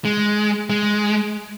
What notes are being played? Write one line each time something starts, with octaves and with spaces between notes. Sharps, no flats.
G#3
G#3